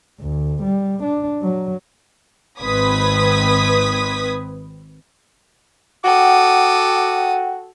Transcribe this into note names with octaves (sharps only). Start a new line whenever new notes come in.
D2
G3
D4
F#3
G#1 C4 B4 D#6 G#6 B6
F#4 A4 F#5 G5 D6 D#6